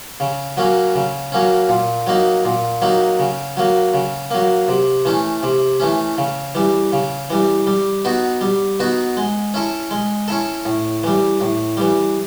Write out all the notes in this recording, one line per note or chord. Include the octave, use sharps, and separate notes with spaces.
C#3
F#3 A#3 C#4
C#3
F#3 A#3 C#4
A#2
F#3 A#3 D#4
A#2
F#3 A#3 D#4
C#3
F#3 A#3
C#3
F#3 A#3
C3
E3 A3 C#4
C3
E3 A3 C#4
C#3
E3 G3
C#3
E3 G3
G3
B3 D#4 F#4
G3
B3 D#4 F#4
G#3
C#4 E4 A4
G#3
C#4 E4 A4
A2
E3 G3
A2
E3 G3